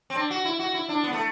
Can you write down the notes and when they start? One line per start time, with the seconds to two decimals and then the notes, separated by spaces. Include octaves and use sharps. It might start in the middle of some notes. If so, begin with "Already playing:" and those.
0.10 C4
0.16 D4
0.30 F#4
0.45 E4
0.59 F#4
0.74 E4
0.89 D4
1.04 B3
1.13 A3